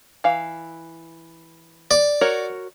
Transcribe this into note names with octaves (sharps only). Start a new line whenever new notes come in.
E3 F5
D5
F#4 A#4 C#5